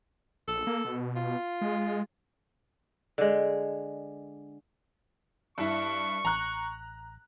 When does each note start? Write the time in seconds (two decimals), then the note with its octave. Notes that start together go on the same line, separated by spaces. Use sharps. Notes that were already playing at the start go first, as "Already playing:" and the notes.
0.48 A#1 A4
0.67 A#3
0.85 B2
1.16 F4
1.61 G#3
3.18 D3 G#3
5.58 G2 E4 C#6
6.25 A1 A#5 F#6